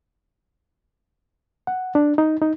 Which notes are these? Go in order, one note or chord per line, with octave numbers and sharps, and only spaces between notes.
F#5
D4
D#4
D#4